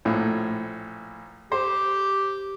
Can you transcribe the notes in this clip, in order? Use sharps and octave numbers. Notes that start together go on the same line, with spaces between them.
A#1 A2
G4 C5